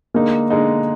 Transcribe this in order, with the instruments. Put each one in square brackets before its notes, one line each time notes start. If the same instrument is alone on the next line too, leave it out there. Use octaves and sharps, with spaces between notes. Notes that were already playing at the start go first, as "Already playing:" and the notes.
[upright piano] D3 G#3 D#4 [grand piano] A#3
[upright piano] D3 G#3 D#4